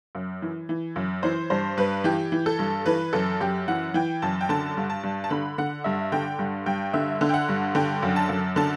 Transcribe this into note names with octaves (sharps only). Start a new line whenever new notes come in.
F#2
E3
E3
F#2
E3 C5
G2 C5
G2 B4
E3 G4
E3
A4
G2
E3 B4
F#2 A4
F#2 G4
E3 F#5
E3 G5
F#2 A5
G5
D3 A5
G2
A5
G2
A5
D3 B5
D3 F#5
G2 E5
D3 G5
G2
G2 G5
D3 E5
D3
G5
F#5
G2
D3 G5
F#2
A5
F#2
D3 A5